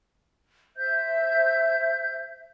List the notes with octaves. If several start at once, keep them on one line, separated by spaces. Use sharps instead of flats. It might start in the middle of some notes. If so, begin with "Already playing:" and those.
C5 E5 G6